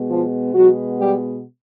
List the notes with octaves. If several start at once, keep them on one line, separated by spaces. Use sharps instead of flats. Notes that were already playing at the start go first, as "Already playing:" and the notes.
Already playing: B2 G#3 B3
F3 F4
B2 F#3 G#3 B3 F#4
G3 G4